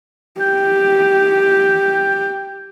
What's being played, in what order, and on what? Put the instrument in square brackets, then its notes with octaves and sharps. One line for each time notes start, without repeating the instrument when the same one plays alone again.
[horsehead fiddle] G4 [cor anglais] G5